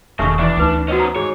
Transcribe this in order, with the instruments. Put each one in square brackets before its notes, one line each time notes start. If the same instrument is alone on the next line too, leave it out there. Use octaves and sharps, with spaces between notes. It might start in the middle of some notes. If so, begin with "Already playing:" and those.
[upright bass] E1 [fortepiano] D#2 A3 F6 [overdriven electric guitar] C#3 [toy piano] E5 C#6
[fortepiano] E2 E3 D5 [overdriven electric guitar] D4
[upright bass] D2 [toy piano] D#4 B4 G5
[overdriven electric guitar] B3 C#4 [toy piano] F#4 C#5 D#5
[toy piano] A#5
[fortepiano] G#2 [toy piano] G#4 [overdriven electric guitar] C#5